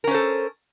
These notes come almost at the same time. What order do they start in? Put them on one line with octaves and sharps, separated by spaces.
A#4 C#4 C5 A4